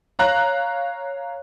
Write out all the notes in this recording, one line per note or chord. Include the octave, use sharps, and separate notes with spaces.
C#5 F5 A#5 F#6